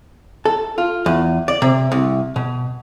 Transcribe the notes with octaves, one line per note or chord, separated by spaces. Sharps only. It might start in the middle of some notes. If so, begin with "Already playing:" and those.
A4
F4
E2
D5
C3
C2
B2